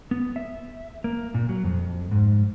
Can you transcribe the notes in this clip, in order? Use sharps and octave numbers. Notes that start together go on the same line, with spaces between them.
B3
E5
A#3
A#2
F#3
F2
G#2